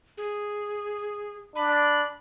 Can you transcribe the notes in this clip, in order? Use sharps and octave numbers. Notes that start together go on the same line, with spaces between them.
G#4
D4 B5